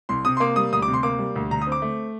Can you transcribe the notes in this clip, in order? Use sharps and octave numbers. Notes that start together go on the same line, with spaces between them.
C2 C6
C3 D#6
C6
A#3 D6
G3 D#6
D2 D#6
D6
C3
C6
A#3 D6
G3
D2
D3 A#5
D#6
C4
D6
A3